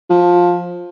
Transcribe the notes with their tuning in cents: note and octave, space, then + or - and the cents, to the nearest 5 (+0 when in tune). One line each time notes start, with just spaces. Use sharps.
F3 +15